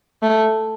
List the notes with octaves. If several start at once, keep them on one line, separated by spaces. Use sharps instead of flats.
A3